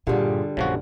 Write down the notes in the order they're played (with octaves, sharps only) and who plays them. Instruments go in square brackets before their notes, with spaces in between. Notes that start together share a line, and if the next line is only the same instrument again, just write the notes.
[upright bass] G2 A#2 [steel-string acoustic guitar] D3 G3 [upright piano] F4 G4 G#4
[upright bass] A#1 [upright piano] F#2 [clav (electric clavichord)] C#3 F3 F#4